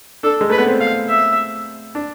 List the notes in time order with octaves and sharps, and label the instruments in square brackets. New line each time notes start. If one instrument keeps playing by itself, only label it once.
[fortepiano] D4 [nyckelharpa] A4
[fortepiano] G#3
[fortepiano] A3 [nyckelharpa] B4
[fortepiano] B3
C4
[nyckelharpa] F5
E5
[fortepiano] D4